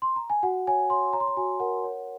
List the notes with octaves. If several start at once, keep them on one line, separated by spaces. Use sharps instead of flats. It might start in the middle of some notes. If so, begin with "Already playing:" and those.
C6
A#5
G#5
F#4 F#5
C#5 G#5
C#5 C6
C#5 A#5
C6
A#5
F#4 G#5
A#4 F#5
C#5